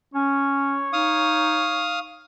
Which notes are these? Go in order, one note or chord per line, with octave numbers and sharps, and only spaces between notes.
C#4 C#5
D#4 F5 D#6